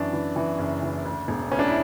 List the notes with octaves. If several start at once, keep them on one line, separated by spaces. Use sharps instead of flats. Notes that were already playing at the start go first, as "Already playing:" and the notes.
Already playing: F#2 E3 D4
E3
E3
F#1
E3
D2
E1
D2 C#4
D4
E4